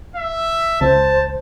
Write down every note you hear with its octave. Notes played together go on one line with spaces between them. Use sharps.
E5
C#2 C5 A5